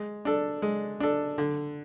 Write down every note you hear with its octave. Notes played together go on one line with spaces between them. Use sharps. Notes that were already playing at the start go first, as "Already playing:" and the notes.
Already playing: G#3
D4 A4
G#3
D4 A4
D3